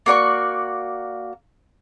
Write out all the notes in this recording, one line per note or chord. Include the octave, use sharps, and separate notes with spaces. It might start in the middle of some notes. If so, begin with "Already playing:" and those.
A#3 F#4 D5 C#6